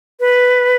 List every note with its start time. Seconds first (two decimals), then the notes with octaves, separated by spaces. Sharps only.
0.20 B4